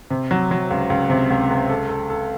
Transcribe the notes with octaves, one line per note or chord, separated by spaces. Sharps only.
C3
F#3
F#3
C#2
C#2
C3
C#2
C#2
A4
A4
A4